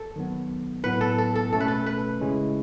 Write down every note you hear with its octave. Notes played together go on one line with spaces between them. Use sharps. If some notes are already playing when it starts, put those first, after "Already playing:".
Already playing: A4
D#3 F#3 B3
A2 F#3 B3 E4 B4
A4
A4
A4
B2 A3 C#4 A4
B4
A4
B4
C#3 G#3 C#4 E4